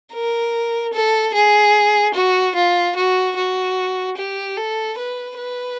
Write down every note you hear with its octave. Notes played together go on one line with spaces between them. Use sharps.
A#4
A4
G#4
F#4
F4
F#4
F#4
G4
A4
B4
B4